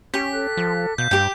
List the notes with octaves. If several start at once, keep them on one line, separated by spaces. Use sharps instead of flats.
C#4 G4 B6
A4 F#6
F3
B2 F5 G6
G2 G4 G5